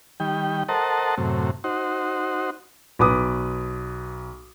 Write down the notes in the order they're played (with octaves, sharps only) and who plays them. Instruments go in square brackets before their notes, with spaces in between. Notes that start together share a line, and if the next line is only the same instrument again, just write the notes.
[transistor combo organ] D#3 G3 G5
A4 A#4 C5 D#5 F#5 A5
F#2 A2 C3
D#4 F#4 C5
[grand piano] B1 B4 D6 D#6